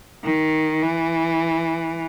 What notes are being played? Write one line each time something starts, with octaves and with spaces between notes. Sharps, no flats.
D#3
E3